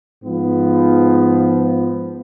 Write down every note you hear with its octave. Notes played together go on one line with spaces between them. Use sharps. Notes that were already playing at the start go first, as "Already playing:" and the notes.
G#2 F3 B3